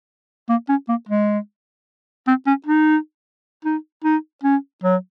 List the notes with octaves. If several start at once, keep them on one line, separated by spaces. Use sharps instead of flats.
A#3
C#4
A#3
G#3
C4
C#4
D#4
D#4
D#4
C#4
F#3